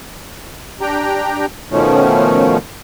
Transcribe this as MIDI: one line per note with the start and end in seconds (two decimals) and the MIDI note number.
0.81 1.46 62
0.81 1.46 67
0.81 1.46 79
0.81 1.46 82
1.71 2.57 47
1.71 2.57 51
1.71 2.57 53
1.71 2.57 57
1.71 2.57 61